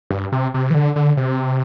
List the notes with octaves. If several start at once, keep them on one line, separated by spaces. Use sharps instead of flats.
G2
C3
C3
E3
D3
D3
C3